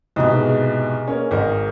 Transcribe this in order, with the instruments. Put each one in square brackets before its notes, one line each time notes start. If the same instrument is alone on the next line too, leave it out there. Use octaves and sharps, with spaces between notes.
[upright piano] C2 G#2 B2 [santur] D#5 A#5 B5
[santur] G#4
[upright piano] A#3 C#4
G#1 A#4 D#5